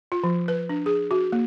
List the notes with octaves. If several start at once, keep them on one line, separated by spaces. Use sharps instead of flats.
F4
F3
B4
D4
G#4
F#4
A#3